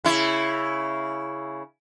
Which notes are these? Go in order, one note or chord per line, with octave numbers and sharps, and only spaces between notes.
C#3 E4